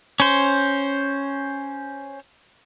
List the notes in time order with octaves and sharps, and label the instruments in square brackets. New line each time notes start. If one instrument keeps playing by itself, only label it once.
[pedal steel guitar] C#4 C5